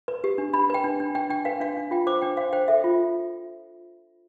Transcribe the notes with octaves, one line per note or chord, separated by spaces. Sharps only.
B4
G4
D4
D4 B5
B4 G5
D4
D4
D4 G5
D4 G5
B4 F5
D4 F5
D4
F4 G5
C5 D6
D4 G5
C5 F5
C5 G5
A4 E5
F4